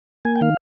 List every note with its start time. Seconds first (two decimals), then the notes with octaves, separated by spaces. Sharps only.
0.25 A#3 G#5
0.36 G5
0.41 D#3 F5